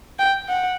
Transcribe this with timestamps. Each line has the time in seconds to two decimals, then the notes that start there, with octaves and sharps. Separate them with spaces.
0.19 G5
0.48 F#5